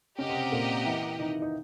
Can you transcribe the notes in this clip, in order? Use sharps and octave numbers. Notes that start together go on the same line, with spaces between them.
C#3 C#4 G4 A#4 D#5 F#5
C3 C4
A#2 A#3
E3 E4
D#3 D#4
D#4